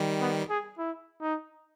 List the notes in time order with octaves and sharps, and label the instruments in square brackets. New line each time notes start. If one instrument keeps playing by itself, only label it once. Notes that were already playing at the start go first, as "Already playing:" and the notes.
Already playing: [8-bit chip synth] D#3 G3
[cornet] B3
G#4
E4
D#4